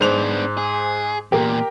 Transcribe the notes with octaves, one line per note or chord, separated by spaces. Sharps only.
G#2 B3 D4 C5 F7
G#4
E2 A#2 G4 A#4